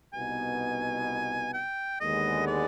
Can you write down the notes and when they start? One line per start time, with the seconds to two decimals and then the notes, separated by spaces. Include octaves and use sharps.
0.13 C2 B2 B3 D#4 G#5
1.53 G5
2.00 D#2 D3 G#3 B3 D#5
2.47 D5